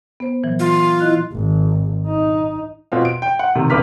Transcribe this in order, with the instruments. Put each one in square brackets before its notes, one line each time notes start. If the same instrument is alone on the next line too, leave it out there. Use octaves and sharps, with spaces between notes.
[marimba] B3 C5
A#2 E3 F#3
[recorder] F4
[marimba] E4 D#5 F#6
[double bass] G#1
D#4
[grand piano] B2 C4 F4
D7
G5
F#5
C3 D#3
D#1 D3 B4 D6 F6 B6